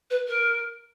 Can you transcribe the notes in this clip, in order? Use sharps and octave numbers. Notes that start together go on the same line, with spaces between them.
B4
A#4